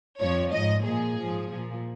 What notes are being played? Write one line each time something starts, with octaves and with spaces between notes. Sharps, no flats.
F2 F3 C#5
G#2 F3 D#5
A#2 F3 G#4
G#2 F3
A#2 F3